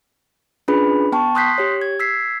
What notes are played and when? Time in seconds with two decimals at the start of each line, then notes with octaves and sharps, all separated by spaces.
0.68 C#4 D4 F4 G#4 B4 B5
1.12 B3 G5 A5 C#6
1.35 C6 D#6 F#6 G6 B6 C7
1.58 G4 C#5
1.82 G#6
2.00 E6 G#6 B6 C7